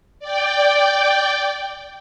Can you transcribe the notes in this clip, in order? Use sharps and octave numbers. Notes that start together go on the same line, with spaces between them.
D5 G5